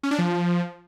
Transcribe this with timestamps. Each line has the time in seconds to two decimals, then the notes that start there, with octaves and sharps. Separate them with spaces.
0.03 C#4
0.11 D4
0.18 F3